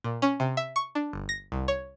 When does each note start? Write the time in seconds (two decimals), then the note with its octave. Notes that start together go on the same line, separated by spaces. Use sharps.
0.04 A#2
0.22 C#4
0.40 C3
0.57 E5
0.76 C#6
0.95 D4
1.13 G1
1.29 A#6
1.52 C2
1.68 C#5